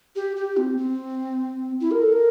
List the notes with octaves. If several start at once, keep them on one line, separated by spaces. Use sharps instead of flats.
G4
G4
C4
C4
E4
A#4
A4
A#4